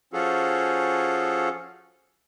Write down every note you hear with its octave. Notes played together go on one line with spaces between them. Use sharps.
F3 C#4 F4 F#4 G#4 A4